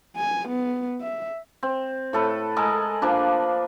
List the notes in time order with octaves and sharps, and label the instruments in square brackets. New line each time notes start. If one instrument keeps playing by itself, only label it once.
[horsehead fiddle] G#5
B3
E5
[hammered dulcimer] C4
A2 A4 B4
G#3 A4 A#4 D#5
F3 A#3 D4 B4